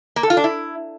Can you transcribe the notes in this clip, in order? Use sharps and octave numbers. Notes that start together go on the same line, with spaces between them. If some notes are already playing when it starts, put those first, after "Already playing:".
A#3
A4
F4
D4
E4